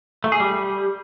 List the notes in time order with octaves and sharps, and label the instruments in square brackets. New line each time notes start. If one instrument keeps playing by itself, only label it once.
[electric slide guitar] A3
G#4
G3